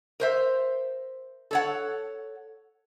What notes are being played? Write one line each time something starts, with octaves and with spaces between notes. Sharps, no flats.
A#4 C5 E5
A4 C#5 F#5